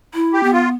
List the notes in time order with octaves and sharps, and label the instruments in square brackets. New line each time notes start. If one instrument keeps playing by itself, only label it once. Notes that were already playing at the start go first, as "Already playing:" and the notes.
[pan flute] E4
[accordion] G4
[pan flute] B3
[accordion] F4